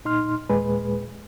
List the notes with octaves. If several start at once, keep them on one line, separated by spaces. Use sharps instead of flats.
A#2 D#4 C6 F6
D#2 A#2 G#3 G#4 B4